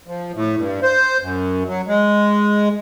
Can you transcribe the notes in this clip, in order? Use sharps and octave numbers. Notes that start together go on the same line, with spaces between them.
F3
A2
G2
C5
F#2
F#3
G#3